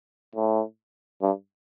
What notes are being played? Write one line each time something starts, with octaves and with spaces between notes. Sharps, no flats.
A2
G2